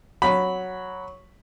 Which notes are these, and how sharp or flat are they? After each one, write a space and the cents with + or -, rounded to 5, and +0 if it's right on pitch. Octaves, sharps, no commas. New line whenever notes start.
F#3 +0 B5 +0